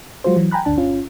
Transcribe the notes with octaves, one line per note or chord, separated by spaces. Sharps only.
F#3 G#3 F4 F#4 C5
E3 F#3
G5 G#5 A#5 B5 F#6
G1 D2 D4 A5
G1 C#4 F4